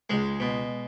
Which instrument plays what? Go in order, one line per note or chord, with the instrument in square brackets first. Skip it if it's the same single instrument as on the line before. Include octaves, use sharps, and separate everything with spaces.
[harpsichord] C#2 G#3
B2